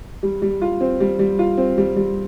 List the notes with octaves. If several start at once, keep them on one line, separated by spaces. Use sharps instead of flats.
G3
G3
F4
C4
G3
G3
F4
C4
G3
G3